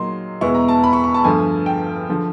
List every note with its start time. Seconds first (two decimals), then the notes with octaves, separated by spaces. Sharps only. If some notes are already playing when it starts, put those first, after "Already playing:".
Already playing: A#2 F#3 A#3 D#4 C6
0.41 E2 B2 G#3 B3 E4 C#6
0.55 A#5
0.68 A5
0.84 B5
0.93 C#6
1.04 C#6
1.14 A5
1.24 G2 D3 F3 A3 G#5
1.66 G5
2.09 D3 F3